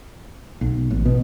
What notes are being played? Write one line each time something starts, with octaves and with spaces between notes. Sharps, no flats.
B1
A1
B2